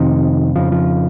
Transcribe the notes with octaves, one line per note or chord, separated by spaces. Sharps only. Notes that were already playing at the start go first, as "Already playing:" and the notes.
Already playing: F2 C3 D#3
F2 C#3 F3
F3